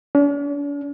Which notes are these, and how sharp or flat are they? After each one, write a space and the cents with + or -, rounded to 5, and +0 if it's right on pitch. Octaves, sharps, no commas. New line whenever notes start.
D4 -45